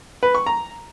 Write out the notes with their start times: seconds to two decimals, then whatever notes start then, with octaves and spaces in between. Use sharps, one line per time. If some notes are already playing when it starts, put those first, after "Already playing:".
0.23 B4
0.35 C#6
0.46 A#5